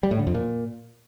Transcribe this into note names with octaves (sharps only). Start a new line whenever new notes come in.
G3
A2
D3
F2
A#2